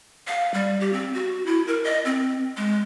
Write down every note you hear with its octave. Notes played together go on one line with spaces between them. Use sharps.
F5
G3
G4
C4
F#4
E4
A#4
D#5
C4
G#3